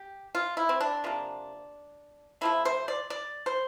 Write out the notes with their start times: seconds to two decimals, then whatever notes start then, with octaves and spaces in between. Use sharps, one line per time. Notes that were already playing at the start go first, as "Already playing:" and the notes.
Already playing: G4
0.35 F4
0.57 E4
0.69 C4
0.81 D4
1.04 C3 F3 A#3
2.41 C3 F3 A3 E4
2.65 C5
2.88 D5
3.10 D5
3.46 C5